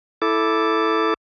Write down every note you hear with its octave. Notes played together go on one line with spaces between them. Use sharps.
E4 A4 D6